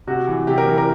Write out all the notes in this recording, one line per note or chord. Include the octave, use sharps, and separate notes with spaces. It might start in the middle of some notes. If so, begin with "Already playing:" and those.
C3 F#4
E3
C3 G4
A#4
E3
A#4